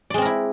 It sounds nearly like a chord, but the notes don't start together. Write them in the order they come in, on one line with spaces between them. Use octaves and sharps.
D5 G#3 C4 A#4 E4